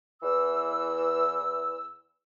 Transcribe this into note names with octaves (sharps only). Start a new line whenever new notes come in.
E2 E3 E6